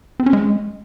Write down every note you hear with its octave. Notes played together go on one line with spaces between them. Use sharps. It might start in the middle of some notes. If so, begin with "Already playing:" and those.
C4
C#4
G#3